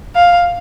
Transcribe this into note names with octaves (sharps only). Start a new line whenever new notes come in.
F5